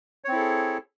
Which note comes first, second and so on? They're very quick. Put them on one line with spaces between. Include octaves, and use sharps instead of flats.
C#5 C4 E4 A4 G#4